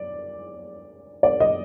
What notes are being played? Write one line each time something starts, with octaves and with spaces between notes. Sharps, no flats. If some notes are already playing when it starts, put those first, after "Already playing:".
Already playing: D5
D5
D#5